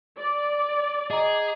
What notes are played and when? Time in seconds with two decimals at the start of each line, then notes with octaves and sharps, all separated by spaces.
0.17 D5
1.11 G#4 D#5 A#5